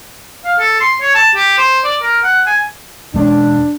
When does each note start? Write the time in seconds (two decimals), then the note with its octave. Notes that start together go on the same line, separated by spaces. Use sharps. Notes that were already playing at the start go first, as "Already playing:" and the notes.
0.45 F5
0.59 A4
0.81 C6
1.01 C#5
1.15 A5
1.35 G4
1.58 C5
1.85 D5
2.02 A#4
2.24 F#5
2.46 G#5
3.14 E1 G#3 C#4 D4